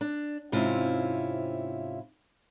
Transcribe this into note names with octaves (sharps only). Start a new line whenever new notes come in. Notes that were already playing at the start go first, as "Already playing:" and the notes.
D4
G#2 C3 C4 C#4 E4 F4